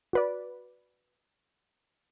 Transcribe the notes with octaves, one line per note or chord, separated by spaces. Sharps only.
F#4 B4 D5